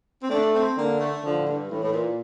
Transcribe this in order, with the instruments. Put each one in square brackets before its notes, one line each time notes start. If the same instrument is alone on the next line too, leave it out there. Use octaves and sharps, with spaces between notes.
[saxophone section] C4
[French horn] A3 [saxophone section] D4
[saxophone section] C4
[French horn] D3 [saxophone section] A#3
[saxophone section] A3
[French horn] D3 [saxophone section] F3
[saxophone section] A2
G2
[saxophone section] A2 [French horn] E3
[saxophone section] A2
A#2